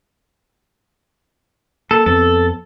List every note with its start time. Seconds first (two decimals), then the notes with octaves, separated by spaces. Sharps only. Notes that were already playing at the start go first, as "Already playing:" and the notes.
1.91 A#3 A4
2.06 F2 B3 C4 A4